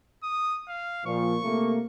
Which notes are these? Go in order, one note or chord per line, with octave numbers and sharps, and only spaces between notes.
D#6
F5
A#2 F3 C#6
C3 A3 A#3